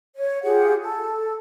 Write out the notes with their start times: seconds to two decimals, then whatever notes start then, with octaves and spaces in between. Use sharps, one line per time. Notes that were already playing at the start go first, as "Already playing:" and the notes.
0.15 C#5
0.43 F4 G4 G#4 F#5
0.82 A4